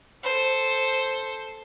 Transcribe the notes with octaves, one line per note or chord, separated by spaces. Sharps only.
A4 C5